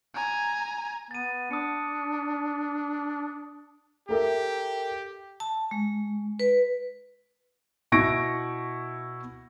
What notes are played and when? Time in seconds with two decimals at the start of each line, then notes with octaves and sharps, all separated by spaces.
0.14 G#5 A#5
1.11 B3 A6 D#7
1.51 D4 D#6 C#7
4.09 G4 A4 A#4 E5
5.40 A5
5.71 G#3
6.39 B4
7.92 B2 E4 C#6 A#6 D7